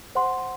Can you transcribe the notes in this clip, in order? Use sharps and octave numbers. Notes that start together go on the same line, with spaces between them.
C5 F#5 C6